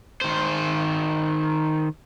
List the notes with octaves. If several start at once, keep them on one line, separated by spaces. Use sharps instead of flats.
D#3 C5